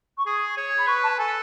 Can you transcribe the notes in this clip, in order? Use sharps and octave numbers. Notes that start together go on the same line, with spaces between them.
C#6
G#4 D#6
C#5
B5
B4 C#6
A5
A4 G#5